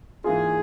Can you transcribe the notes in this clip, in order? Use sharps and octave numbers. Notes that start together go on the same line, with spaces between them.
G#2 E3 A#3 F4 G#4